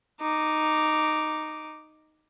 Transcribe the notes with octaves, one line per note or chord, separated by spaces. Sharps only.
D#4 D6